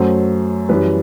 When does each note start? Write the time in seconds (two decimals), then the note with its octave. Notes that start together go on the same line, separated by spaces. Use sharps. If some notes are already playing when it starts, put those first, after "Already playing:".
Already playing: F#2 F#3 A3 C5
0.69 F#2 E3 G3 B4